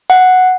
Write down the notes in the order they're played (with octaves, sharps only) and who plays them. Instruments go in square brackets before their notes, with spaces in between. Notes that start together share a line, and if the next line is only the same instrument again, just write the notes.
[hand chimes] F#5